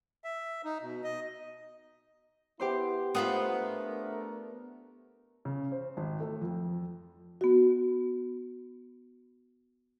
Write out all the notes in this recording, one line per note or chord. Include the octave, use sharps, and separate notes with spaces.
E5
D#4
B2
D#5
B3 E4 G4 C5 C6
A3 B3 D4 F4 A#4 C5 F#5 D#6
C#3
C5
G#1
A3
F2
B3 F#4